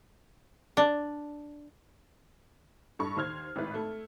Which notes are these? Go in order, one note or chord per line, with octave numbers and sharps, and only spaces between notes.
D4
G2 A4 B5 C#6
D#2 C5 F6 G#6
G#1 A2 B4
A3